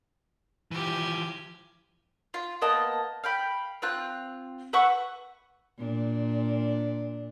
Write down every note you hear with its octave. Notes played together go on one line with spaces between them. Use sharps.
E3 F3 G4 G#5
F4
A#3 B3 D#5 A5
F5 G5 B5
C4 F4 F#6
B4 E5 F#5 C#6
A#2 D4